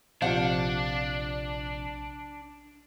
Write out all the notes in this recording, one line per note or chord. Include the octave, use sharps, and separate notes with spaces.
A#1 C3 F3 D4 C5 F5 F#5